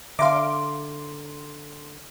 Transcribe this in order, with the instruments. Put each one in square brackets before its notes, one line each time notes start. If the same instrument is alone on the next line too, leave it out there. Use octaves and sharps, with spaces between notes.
[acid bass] D3 [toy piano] E5 [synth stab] F5 D6 [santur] A#5 C6